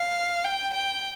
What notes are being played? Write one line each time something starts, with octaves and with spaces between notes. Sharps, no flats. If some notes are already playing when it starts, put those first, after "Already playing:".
Already playing: F5
G5
G5